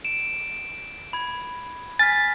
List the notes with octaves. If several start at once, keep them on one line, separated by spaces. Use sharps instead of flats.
D7 E7
B5 G#6
G#5 F6 A6 B6